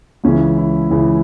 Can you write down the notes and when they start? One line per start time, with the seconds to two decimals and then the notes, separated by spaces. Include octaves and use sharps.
0.24 C#2 C#3 E3 C#4
0.57 E4
0.90 C#2 C#3 E3